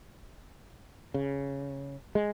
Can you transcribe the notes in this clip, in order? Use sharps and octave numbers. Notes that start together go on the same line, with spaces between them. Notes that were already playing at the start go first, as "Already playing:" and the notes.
C#3
G#3